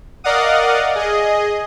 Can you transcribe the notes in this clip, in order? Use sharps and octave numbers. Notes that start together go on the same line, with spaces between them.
A#4 D5 D#5 F5 F#5 D#6
G#4 D#5